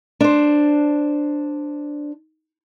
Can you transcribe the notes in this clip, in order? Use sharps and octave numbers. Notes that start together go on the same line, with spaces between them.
D4 C5